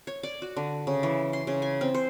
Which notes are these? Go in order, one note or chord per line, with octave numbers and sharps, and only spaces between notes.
C#5
D5
F#4
D3
C#3
E3
C6
C#3
G#5
C4
C5